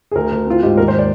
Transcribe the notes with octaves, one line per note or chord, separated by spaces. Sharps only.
G#4
D2 A#4
D2
C4 F4
G#2 G4
D#2 A#4
C5
D5